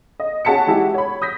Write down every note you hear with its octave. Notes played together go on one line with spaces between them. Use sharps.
D#5
C#4 F#4 G#4 A5 B6 C#7
G#3 E4 F#4 G4
C#5 B5
D#6 G6 A#6 B6